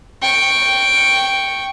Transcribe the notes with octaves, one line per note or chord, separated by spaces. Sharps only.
G5 C#6